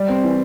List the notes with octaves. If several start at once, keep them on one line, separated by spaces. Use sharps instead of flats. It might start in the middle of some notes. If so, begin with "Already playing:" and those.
Already playing: G3
C4
E3